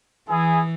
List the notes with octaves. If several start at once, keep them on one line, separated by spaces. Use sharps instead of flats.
E3 E4 G#4